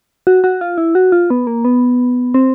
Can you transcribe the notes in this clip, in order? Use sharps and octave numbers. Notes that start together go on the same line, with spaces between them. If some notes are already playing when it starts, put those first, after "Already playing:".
F#4
F#4
F4
E4
F#4
F4
B3
A#3
B3
C4